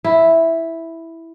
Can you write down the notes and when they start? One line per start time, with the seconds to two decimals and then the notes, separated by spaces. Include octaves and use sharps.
0.04 E4